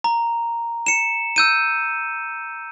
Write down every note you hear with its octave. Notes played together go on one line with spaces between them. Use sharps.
A#5
C#7 E7
E6 G6 D#7